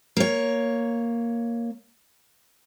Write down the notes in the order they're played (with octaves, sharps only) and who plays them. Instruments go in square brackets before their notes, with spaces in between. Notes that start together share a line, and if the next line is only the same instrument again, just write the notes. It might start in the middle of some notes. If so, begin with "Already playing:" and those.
[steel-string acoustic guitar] A#3 C#5